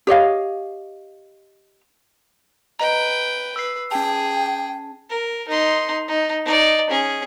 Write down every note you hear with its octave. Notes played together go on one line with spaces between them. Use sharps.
G4 C#5 D#5 F5
B4 D#5 G5 A#5
B4 E6 C7
C#4 G#4 G5 A5
A#4
D#4 C6
D#4
D#4 D5
C#4 G#4